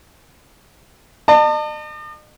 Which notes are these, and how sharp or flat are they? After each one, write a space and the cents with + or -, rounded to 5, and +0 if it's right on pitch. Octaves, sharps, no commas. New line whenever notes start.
D#5 -45 A5 +35